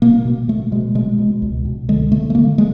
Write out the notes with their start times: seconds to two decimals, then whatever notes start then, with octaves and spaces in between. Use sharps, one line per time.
0.02 B2 A#3
0.25 B2
0.48 B2 A3
0.72 B2 G#3
0.95 B2 G#3
1.19 B2
1.42 C#2
1.65 B2
1.89 D3 G#3
2.12 D3 A3
2.30 A3
2.35 D3 A#3
2.58 G#3